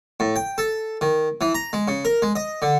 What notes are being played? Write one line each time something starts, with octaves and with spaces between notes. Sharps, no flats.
A2
G5
A4
D#3
E3
A#5
G#3
C#3
A#4
G#3
D#5
D3